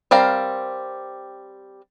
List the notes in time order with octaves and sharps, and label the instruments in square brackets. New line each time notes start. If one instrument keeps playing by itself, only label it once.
[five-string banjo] G3 C4 A#4 F5